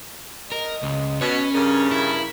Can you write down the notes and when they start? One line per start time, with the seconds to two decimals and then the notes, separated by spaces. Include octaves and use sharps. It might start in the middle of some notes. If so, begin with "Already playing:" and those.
0.52 A#4 D#5
0.83 C#2
1.21 B2 C#4 B4 C#5
1.54 G2 C#3 A#4
1.91 E4